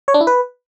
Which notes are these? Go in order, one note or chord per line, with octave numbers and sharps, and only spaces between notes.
C#5
D4
E4
B4